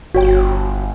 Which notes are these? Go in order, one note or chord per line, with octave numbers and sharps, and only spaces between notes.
G1 F#4 C#5 G5